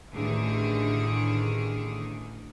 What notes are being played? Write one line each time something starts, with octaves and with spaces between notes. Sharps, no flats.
A1 D3 D#3 G#4